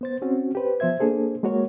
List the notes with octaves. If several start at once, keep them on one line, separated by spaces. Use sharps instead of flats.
B3 C5 A6
C4 C#4 F#4
G4 B4 C5
F3 B3 C5 E5 G#6
A#3 D4 G#4 A4 C5
G#3 A#3 F#4 A#4 C#5